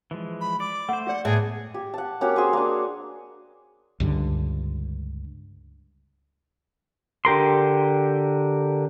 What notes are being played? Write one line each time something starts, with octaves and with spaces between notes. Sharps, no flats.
E3 F3 G#3
B5
D5 D6
A3 C5 F#5
F4 D5 F#5
A2 B3 G#4 E5
G4
F#5 A5
A#3 C#4 F#4 G4
G#4 C5 G#5
A#3 D4
C#2 G2 D3
D3 G4 A#4 C6